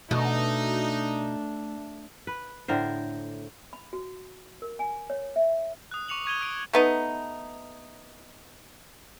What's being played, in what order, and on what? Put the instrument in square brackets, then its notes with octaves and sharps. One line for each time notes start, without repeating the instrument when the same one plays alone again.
[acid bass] B2 [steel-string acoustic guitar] A3 [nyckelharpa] D4 [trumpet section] D#4
[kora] B4
A2 D3 A#4 C5
[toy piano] B5
F#4
A#4
G#5
C#5
E5
[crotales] D#6 F#6
C#6 D6 C#7 F7 F#7
C#6 G#6 D#7 G7
C#6 D#6 D7 D#7
[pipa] A3 B3 D#4